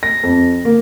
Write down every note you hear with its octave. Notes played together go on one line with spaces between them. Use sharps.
A#6
F2
A#3